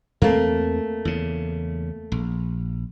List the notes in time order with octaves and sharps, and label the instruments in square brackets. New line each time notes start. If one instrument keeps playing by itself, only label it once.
[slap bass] E2 C4 [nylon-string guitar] A3 A#3
[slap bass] E2 C#3
A#1